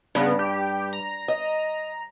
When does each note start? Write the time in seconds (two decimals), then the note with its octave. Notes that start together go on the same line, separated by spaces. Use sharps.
0.15 G2 C#3 B3
0.39 G4
0.93 A#5
1.28 D#5